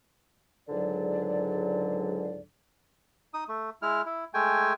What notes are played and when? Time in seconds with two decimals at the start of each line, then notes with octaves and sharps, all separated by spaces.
0.69 C#2 G#2 D3 F#3 D5
3.34 D#4 D#6
3.49 A3
3.82 G#3 E4 F6
4.06 E4
4.34 G#3 A3 G5 G#5